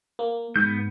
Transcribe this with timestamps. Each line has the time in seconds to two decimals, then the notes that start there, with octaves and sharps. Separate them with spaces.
0.19 A#3
0.56 G#2 B3 G6